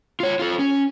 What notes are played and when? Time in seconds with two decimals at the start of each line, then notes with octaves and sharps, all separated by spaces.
0.20 F4 C#5
0.39 F4 A4
0.59 C#4